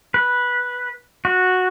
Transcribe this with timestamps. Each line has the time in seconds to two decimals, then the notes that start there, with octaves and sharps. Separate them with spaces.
0.14 B4
1.25 F#4